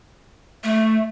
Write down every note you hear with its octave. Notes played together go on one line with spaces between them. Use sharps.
A3